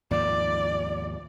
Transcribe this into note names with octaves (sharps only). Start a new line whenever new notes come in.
D#2 G#2 F3 D5